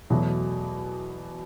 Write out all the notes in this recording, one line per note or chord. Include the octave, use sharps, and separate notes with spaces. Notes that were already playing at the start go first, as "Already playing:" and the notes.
E2 B2 F#3 A3